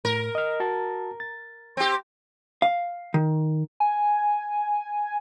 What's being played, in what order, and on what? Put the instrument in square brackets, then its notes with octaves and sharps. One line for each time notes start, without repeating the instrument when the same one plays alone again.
[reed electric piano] A2 [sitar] A#4
[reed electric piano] D#5 F6
F#4 A5 A6
A6
[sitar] C4 G4
[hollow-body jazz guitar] F5
D#3
[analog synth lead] G#5